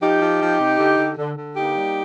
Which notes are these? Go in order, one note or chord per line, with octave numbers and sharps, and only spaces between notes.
F3 D#4 G4
F3
F3
C3
D3
D3
D3
D3
A#3 D#4 G4
G3